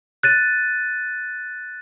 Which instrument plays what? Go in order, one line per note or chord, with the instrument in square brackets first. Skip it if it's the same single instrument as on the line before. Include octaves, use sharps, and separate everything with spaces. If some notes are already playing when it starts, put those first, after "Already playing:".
[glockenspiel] F#6 A6 D#7